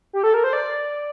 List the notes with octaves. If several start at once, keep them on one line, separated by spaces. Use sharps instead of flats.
G4
A4
A#4
C5
D5